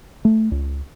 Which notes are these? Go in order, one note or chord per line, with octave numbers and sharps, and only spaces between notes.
A3
C#2